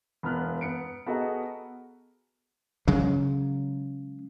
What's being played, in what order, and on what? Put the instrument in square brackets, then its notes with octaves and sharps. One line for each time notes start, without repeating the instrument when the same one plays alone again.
[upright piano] E1 B3 F6 F#6
B3 C#7 D7
B3 F#4 G#4 A4 D#5 A#5
[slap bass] C#3 F#3 G#3